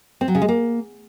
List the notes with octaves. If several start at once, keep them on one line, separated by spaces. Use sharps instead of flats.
C4
F#3
C#3
G#3
A#3